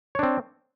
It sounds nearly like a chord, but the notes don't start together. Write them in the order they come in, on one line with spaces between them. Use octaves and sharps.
C#5 D4 C4